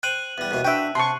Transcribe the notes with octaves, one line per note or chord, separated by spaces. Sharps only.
C5 G5 F#6 D#7 F#7
E2 G3
D#2 B2 E3
D4 F#4 B4 E5 G5
C3 A5 C6 C#6